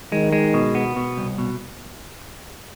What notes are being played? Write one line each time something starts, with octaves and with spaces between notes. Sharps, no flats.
D#3 G#3
G#3
B2
B3
B2
C2
B2